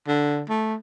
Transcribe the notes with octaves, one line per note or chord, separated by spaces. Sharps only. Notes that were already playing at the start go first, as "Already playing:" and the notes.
D3
A3